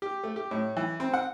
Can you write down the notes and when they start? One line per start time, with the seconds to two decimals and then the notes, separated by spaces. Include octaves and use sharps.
0.02 G4
0.23 A3
0.36 G4
0.51 A2
0.77 E3
1.00 C4
1.14 F#5